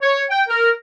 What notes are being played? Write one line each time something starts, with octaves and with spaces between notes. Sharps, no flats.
C#5
G5
A#4